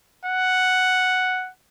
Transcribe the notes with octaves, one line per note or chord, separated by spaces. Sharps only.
F#5